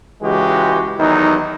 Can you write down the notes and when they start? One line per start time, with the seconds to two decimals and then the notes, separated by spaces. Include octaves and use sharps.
0.22 C#2 E3 G#3 F#4 G4
0.99 E2 D#3 F#3 D#4